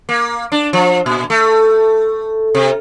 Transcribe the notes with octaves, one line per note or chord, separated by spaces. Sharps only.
A#3
D4
F3
A#2
A3
C3